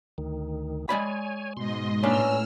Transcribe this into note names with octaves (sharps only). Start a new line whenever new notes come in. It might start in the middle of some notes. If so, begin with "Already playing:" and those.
D2 D#3
G#3 C#5 D5 G#5 B5
G#2 B2 D#5 C6
A2 A#3 C#4 D4 B4 E6 F6